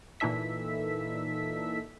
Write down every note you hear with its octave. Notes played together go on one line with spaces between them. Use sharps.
A#2 E3 D#4 A4 E5 B6